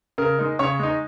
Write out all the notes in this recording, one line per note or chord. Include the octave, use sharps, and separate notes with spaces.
C#3 A#4
G#3 D#4
C#3 C#5
G#3 D#4